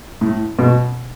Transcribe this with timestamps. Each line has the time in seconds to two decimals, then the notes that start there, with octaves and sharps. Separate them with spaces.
0.21 A2
0.59 B2